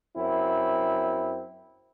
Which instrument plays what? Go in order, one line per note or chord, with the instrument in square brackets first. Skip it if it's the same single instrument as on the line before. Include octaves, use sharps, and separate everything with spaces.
[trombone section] F#2 C4 E4